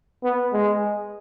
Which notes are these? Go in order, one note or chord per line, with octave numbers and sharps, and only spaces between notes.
B3
G#3